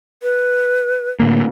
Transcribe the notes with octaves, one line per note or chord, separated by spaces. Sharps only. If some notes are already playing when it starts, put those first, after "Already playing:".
B4
A2 D3 A#3